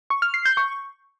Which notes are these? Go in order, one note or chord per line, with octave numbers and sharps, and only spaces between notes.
C#6
F6
C7
G6
C#6